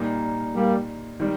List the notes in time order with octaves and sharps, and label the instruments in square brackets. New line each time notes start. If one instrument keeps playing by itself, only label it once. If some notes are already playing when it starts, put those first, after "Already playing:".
Already playing: [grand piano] A#2 G3 A#3 D#4
[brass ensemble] G3 A#3
[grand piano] D#3 G3